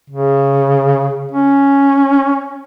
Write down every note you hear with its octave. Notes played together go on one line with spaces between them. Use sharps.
C#3
C#4